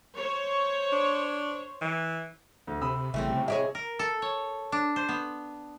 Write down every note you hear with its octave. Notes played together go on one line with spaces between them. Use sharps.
C5 C#5
D4
E3
D2
C3 B5 D#6 E6
A1 C#3 A3 C4 E4
C3
E4 G4 G#4 C#5 D#5 E5
A#4
A4
C#5
D4
C5
B3